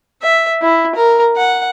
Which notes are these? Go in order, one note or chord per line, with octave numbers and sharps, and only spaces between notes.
E5
E4
A#4
F#5